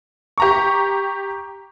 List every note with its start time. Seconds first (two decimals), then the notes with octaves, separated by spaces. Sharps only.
0.38 G4 A#5 C#6